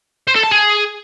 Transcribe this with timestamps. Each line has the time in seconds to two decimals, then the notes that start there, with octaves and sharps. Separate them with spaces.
0.28 C5
0.36 A4
0.44 A5
0.52 G#4